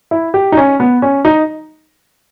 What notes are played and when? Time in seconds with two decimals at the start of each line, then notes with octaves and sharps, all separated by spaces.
0.11 E4
0.34 G4
0.52 D#4
0.57 C#4
0.80 B3
1.02 C#4
1.25 D#4